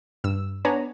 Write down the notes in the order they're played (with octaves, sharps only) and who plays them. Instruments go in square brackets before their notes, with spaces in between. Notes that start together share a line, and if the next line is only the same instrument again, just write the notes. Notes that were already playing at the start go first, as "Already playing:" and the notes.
[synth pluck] G2 E6
B3 D4 B4 C#5 G#5 A#5